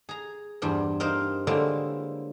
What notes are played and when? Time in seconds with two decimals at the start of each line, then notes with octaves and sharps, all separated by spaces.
0.09 G#4 A#5
0.62 E2 G2 C4
1.00 C4 D#4 A#4 C5 F5
1.47 D3 F#3 G#3 A#3 C4 E4